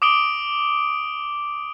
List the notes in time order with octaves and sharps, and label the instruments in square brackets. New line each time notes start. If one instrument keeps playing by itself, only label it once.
[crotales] D6 D#6 D7 G7